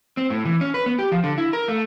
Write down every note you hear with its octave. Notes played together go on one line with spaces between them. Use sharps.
C4
A2
E3
C#4
B4
B3
G4
F3
D3
E4
A#4
A3